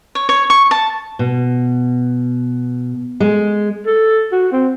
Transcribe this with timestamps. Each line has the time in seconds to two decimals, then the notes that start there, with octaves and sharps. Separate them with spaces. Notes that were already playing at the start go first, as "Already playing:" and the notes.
0.15 C#5
0.29 C#5
0.50 C#6
0.71 A5
1.19 B2
3.20 G#3
3.86 A4
4.32 F#4
4.52 C4